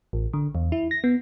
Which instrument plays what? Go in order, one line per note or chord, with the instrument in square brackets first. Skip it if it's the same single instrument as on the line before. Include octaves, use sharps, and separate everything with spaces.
[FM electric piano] A1
D3
E2
E4
A#6
B3